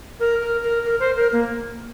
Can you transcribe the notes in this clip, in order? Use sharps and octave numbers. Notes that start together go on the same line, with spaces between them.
A#4
A#4
A#4
A#4
C5
A#4
A#3